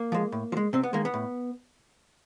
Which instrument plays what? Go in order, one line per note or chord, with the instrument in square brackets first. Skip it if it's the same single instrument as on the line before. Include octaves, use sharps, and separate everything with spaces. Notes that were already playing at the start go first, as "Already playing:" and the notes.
Already playing: [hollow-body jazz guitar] A#3
F3 G#3
A2
F3
G#3
C3 C4
B3
D#3 G#3 A#3
B3
A2